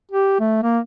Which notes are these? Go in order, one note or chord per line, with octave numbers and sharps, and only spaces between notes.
G4
A3
A#3